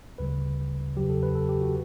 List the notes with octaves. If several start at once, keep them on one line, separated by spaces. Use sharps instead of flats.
D2 C#3 G3 B4
E2 C#3 F#3 G4
A4
B4
A4
G4
F#4